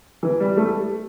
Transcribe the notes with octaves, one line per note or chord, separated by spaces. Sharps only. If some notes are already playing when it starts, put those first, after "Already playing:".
E3
G3
A3